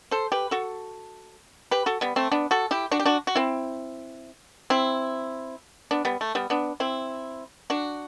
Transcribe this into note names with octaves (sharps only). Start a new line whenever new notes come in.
A4 C5
G4 B4
F#4 A4
G4 B4
F#4 A4
G3 B3
A3 C4
B3 D4
F#4 A4
E4 G4
D4 F#4
G4
D4 F#4
F#4
C4 E4
C4 E4
B3 D4
G3 B3
A3
G3 B3
B3 D4
C4 E4
D4 F#4